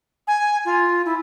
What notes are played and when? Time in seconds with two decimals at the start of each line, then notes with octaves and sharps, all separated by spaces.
0.27 G#5
0.65 F4
1.05 E4